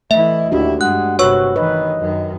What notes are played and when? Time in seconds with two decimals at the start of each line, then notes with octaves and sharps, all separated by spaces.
0.11 E3 A3 E4 D#5 E5
0.52 D#2 D4 E4 F#4 G4
0.81 G2 G#3 F#5 F#6
1.19 G1 C3 F#4 B4 C#5 C#6 E6
1.56 D#3 E3 B4 D#5
2.00 F#2 D#3